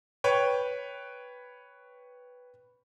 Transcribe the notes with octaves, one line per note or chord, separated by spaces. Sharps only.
B4 C#5 G5